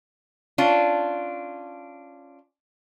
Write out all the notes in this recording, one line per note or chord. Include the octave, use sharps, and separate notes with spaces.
C#4 D4 F4